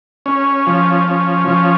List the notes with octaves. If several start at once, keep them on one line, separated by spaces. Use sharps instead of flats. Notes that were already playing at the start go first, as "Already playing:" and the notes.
C#4
F3
C#4
F3